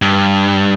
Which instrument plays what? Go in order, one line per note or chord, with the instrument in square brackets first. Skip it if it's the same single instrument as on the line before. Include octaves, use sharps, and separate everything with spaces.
[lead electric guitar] G2